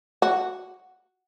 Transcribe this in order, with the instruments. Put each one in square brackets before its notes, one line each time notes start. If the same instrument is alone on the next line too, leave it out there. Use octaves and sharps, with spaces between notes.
[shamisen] F#4